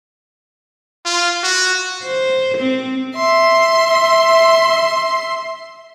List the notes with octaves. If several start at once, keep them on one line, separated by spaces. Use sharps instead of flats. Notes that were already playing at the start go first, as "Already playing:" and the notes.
F4
F#4
C5
C4
E5 C6